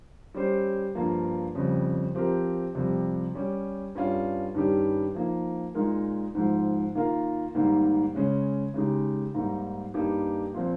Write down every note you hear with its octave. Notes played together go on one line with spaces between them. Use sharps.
G3 C#4 G4 C5
G2 F3 A#3 F4
F2 C#3 G3
F3 C4 G4 A#4
F2 C3 G3
G3 C#4 G4
G2 G3 C#4 F4
G2 D#3 G3 C#4 G4
F3 A#3 D#4
A#2 G#3 D#4 A#4
G#2 F3 G#3
D#3 A#3 F4 A#4
G#2 D#3 G3 A#3
C#3 G#3 C#4
C#3 G#3 D#4 G4
G#2 G3 A#3 D#4
G2 G3 A#3 D#4 G4
A#2 F3 C4